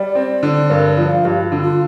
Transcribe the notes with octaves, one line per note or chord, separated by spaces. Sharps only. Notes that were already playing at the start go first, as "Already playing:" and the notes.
Already playing: G3 D5
C4
D3
G2 A#4
D5
F3
F5
G2 G4
F4
D3
F4